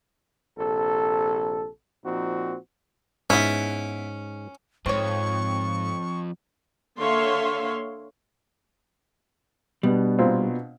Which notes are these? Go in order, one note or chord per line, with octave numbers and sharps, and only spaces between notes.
A#1 C3 A4
A#2 F3 C4 D#4 F#4
G#2 B3 C#4 E4
F2 G#2 C4 C#5 C#6
D3 A#3 C#5 E5 F5 C6
B2 G3 B3 D4
A#2 C4